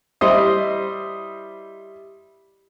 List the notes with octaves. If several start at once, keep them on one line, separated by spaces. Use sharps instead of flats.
G3 E4 C5 D#5